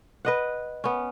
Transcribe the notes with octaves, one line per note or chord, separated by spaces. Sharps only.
B4 D#5 F#5
B3 C#4